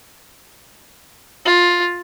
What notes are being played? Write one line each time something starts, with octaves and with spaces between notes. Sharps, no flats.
F4